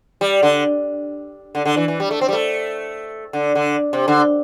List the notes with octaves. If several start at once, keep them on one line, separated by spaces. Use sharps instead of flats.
G3
D3
D3
D3
E3
E3
G3
A3
C4
G3
A3
D3
D3
C3
D3